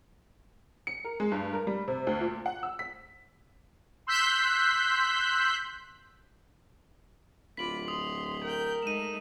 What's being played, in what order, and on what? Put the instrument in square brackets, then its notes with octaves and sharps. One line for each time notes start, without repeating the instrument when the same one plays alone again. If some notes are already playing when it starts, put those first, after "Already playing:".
[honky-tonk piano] C#7
A#4
G#3
G2
A#4
G3
C3
D2
A#2
F#5
E6
B6
[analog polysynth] C6 E6 F#6 G6 B6
[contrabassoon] D1 [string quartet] F4 B5 D6 [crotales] B6 F#7
[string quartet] C6 [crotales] D#6
[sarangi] A#4 [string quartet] G5 G6
[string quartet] G#3 A3 D#4 [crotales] D#7 E7